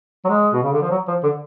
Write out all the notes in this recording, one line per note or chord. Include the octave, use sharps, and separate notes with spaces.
F#3
G#3
B2
C#3
D3
F3
F#3
F3
D3